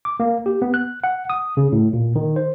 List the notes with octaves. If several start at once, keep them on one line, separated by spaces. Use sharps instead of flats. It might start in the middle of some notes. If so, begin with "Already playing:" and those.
D6
A#3
G4
B3
F#6
F#5
D#6
C#3
A2
A#2
D#3
C5